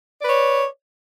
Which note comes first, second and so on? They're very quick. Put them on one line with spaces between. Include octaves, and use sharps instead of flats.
D5 B4 C#5